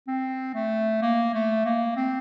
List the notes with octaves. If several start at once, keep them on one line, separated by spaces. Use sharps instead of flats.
C4
A3
A#3
A3
A#3
C4